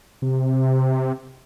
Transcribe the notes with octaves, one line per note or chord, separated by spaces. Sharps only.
C3